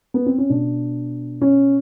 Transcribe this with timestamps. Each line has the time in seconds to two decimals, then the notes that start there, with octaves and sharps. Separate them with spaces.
0.14 B3
0.26 C4
0.38 C#4
0.50 B2 D4
1.41 C#4